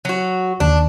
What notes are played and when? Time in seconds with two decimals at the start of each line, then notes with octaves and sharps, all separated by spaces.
0.05 F#3 F#4
0.60 D#2 D#3 D4